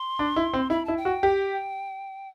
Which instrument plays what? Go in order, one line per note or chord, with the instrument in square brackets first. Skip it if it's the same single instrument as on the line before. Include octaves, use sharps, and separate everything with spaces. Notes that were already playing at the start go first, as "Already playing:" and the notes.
Already playing: [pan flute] C6
[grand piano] D4
E4
C4
[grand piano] E4 [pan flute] B5
[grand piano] E4 [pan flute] A5
[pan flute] G5
[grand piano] F#4
G4